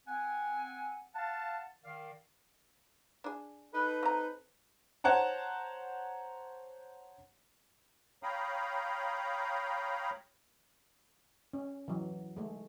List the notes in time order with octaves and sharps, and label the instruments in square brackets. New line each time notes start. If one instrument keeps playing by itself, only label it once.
[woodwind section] C4 F#5 G#5
F5 F#5 A5
D#3 D5 F5
[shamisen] D4 G#4
[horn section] D#4 A4 B4
[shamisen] C4 A#5
[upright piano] C5 C#5 F#5 A5 A#5
[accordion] C#5 F5 G5 A#5 B5 D#6
[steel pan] C#4
E3 F#3
G#3 A3